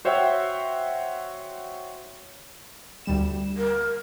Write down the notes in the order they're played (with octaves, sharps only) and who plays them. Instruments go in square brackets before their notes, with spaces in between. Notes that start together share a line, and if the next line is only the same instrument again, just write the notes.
[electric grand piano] F#4 C5 C#5 E5 F#5 G5
[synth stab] D2 G3 E7
[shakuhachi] A#4